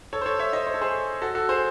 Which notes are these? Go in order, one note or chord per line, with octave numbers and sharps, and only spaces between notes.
A4 C#5
C5
A4 C#5
C#5 E5
C5 D#5
C5
A4
G#4 C5
F#4 A4
F#4 A4
G#4 C5